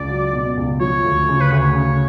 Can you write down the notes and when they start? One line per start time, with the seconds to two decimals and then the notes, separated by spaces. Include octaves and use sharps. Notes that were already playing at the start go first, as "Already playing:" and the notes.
Already playing: C#2 D5
0.10 F#3
0.33 B2
0.57 C#2
0.80 F3 C#5
1.04 D2
1.29 C#3
1.41 B4
1.51 D2 C#5
1.75 C#3